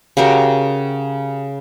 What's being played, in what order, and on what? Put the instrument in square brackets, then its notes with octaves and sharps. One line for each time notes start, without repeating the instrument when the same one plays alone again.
[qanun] C#3 F#4 G4 A#4